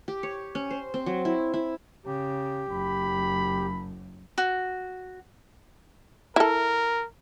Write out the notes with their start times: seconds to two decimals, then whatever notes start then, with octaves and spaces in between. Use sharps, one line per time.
0.08 G4
0.23 C#5
0.55 C#4
0.71 C5
0.94 C4
1.06 F#3
1.25 E4
1.54 E4
2.06 C#3 G4
2.71 F#1 B5
4.38 F#4
6.36 E4 A4 A#4